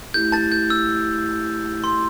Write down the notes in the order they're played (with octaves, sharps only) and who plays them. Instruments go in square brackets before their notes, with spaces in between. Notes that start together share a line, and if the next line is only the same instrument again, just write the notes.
[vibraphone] A3 E4 G4 [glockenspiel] G6
[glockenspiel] A5 A6
G6
E6
C6